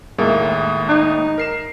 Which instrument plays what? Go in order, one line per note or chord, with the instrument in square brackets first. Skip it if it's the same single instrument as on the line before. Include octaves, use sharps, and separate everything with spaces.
[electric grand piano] D#2 A2 [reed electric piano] G#3 A#3 E5
[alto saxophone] D#4
[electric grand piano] A#4 C7 E7